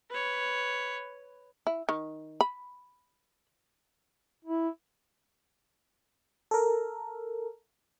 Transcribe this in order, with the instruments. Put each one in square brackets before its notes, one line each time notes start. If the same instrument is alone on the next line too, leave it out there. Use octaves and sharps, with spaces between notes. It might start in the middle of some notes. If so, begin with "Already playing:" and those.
[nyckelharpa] B4 C#5
[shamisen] E4
D#3
B5
[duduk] E4
[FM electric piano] A4 A#4